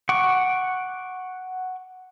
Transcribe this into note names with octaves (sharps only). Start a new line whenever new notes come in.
F#5 C#6 D6